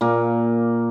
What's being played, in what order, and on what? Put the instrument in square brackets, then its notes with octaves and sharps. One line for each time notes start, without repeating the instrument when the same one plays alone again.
[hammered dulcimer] A#2 A#3